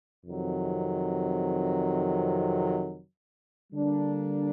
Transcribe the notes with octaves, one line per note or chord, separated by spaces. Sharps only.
F2 C3 D#3 F#3
D3 G3 A#3 D4